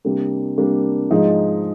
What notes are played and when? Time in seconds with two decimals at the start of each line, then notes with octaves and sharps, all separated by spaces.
0.05 C3 G3 A#3 D4
0.58 C3 G3 A#3 D4
1.11 G#2 F3 G#3 D#4